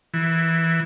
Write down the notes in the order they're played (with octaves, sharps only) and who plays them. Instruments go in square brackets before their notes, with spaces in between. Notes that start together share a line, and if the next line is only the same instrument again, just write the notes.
[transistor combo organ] E3